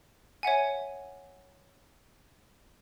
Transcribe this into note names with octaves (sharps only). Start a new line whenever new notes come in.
C#5 E5 F#5 G#5